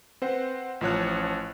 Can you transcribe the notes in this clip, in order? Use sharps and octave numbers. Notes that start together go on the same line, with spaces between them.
C4 B4 C5 F#5
A1 F3 C#5 F#6